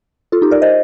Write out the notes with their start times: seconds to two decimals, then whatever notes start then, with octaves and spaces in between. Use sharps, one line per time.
0.32 F4 A4
0.42 D#4 G4
0.51 A#4 D5
0.62 C5 D#5